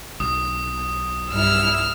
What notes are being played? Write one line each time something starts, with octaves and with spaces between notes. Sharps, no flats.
B1 D#6
G2 E4 E6 F6